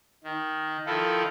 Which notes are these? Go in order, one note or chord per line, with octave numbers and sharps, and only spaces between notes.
D#3
D#3 F3 E4 F4 A4